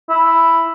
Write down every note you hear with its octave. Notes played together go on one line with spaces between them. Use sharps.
E4